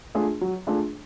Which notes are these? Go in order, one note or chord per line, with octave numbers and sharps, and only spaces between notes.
A3 D4 F4 G#4
F#3
A3 D4 F4 G#4